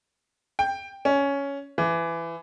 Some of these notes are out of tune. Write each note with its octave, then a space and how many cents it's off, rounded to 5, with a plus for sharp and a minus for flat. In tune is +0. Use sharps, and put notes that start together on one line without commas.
G5 +10
C#4 +10
E3 +20